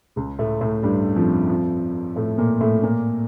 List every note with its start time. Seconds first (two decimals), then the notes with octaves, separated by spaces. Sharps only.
0.16 C#2 C#3
0.39 A2 A3
0.61 A2 A3
0.83 G2 G3
1.16 F2 F3
1.49 F2 F3
2.16 A2 A3
2.38 A#2 A#3
2.61 A2 A3
2.83 A#2 A#3